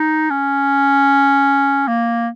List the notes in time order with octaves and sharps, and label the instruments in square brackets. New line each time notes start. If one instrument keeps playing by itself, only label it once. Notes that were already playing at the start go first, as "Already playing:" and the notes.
Already playing: [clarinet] D#4
C#4
A#3